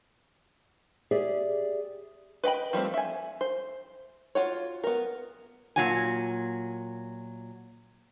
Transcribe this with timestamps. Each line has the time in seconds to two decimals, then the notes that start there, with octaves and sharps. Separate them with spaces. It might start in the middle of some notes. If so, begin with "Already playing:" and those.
1.11 G4 G#4 D5 E5
2.44 B4 D#5 G5 B5
2.73 F3 G3 A3 C4
2.94 E5 G#5
3.41 C5
4.35 F4 F#4 C#5
4.84 B3 A#4
5.76 A#2 F#3 G#5